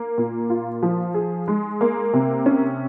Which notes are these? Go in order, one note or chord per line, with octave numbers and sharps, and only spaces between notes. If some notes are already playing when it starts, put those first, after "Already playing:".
Already playing: A#3
A#2
F4
F3
G#4
G#3
A#3
C3
C#4